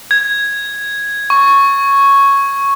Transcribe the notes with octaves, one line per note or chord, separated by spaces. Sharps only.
G#6
C#6